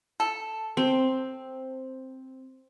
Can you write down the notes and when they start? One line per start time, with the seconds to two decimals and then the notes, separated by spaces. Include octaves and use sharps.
0.20 A4
0.77 C4